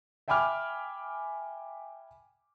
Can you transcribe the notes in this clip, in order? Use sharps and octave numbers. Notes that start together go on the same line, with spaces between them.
E5 G5 G#5 B5 D6 F6